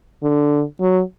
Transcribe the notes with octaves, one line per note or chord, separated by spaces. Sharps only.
D3
F#3